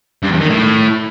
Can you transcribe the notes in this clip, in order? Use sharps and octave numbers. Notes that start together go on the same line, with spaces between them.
G2
E2
D#3
A2